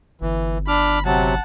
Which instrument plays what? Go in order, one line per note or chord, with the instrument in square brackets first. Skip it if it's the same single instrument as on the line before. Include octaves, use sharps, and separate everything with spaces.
[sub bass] G1 [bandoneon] E3
[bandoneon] D4 D6 F6 [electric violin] B5
[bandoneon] C3 F#3 [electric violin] F#5 A5